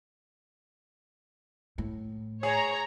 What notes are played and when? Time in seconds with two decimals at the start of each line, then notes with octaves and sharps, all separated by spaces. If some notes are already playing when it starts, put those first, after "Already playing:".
1.78 A2
2.43 G#4 C#5 A#5